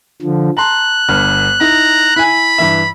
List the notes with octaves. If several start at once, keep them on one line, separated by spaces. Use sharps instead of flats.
D3 F3
A5 A#5 C6 F#6
G1 G2 F6
D#4 E4 A#5
E4 G#5 B5
G2 E3 E5